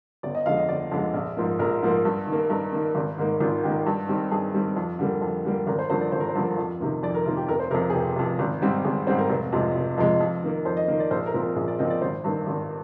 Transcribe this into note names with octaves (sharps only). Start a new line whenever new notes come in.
G1 D5
D#5
F2 D3 G#3 F5
D#5
G1 D5
F2 D3 G#3
A#1
G#2 F3 A#3
A#1 A#4
G#2 F3 A#3
G2
D#3
A#3
G2 A#4
D#3 A#3
G#1
G#2 D#3 A#3
G#1 F4
G#2 D#3 A#3 G4
G2
D#3 G3 C4
G2 G#4
D#3 G3 C4
F2
D3 G3 A#3
F2
D3 G3 A#3
G#1 A#4
C5
G2 D3 F3 A#3 C5
D5
G#1 C5
A#4
C5
G2 D3 F3 A#3
F2
C3 D#3 A#3
F2 D5
A#4
C3 D#3 A#3 F4
G4
F1 A#4
C5
F2 C3 A#4
G#4
F1 G4
F2 C3
G#1
G#2 G3 C4
G#1 G#4
G#2 G3 C4 C5
A#4
F1
F2 C3 F3 G#3
F1
F2 C3 F3 G#3
F2
D#3 A#3
F2 C5
D#5
D#3 A#3
D5
A#1 C5
A#4
A#2 F3 C4
A#4
A#1 G#4
D5
A#2 F3 C4 D#5
D5
G#1 C5
G2 D#3 A#3
G#1